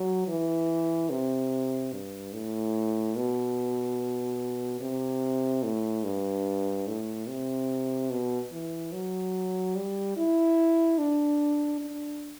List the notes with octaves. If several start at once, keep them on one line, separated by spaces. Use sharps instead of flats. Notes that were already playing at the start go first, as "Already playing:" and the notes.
Already playing: F#3
E3
C3
G2
A2
B2
C3
A2
G2
A2
C3
B2
E3
F#3
G3
E4
D4
D4